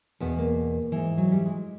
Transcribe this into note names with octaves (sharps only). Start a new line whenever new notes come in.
E2 B2 B3
A#3
G#2 E3
F#3
G3
G#3